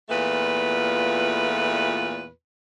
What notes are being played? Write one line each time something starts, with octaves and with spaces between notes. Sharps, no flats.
E2 A#2 A3 B3 F4 B4